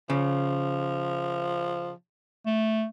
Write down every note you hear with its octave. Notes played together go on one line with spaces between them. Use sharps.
C#3 F3
A3